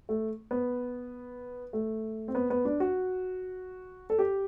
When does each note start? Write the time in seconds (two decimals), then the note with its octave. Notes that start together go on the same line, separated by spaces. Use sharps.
0.09 A3
0.51 B3
1.73 A3
2.28 C4
2.35 B3
2.50 B3
2.65 D4
2.80 F#4
4.10 A4
4.19 G4